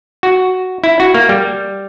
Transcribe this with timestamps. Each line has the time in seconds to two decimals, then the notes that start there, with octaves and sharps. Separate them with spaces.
0.23 F#4
0.84 E4
1.00 F#4
1.14 A#3
1.29 G3